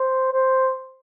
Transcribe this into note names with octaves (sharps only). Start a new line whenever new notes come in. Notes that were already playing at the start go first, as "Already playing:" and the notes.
Already playing: C5
C5